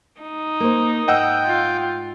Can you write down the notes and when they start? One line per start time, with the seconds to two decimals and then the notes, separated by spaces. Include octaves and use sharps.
0.21 D#4
0.60 A#3 C5
1.08 G#2 D#5 F#5 G5 E6
1.46 F4